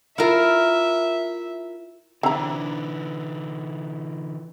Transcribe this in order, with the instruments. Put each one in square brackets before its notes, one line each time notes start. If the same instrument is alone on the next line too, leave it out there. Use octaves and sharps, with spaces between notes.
[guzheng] E4 A#4 [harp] F4 F5 [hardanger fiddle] E5
[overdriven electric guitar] D3 E3 [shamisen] C4 A#5 [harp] D4 E4 B4